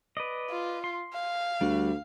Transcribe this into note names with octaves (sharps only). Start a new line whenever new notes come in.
B4 D5 D#5
F4
C6
F5
D2 G3 F#4